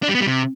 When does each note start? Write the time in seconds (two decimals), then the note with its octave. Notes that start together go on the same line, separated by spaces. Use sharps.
0.03 D4
0.09 G3
0.15 B3
0.21 G3
0.27 C3